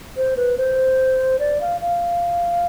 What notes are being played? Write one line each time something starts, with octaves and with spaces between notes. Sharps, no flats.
C5
B4
C5
D5
F5
F5